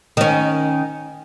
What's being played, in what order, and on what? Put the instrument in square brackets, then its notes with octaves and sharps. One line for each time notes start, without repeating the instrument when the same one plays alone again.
[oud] D#3 C#4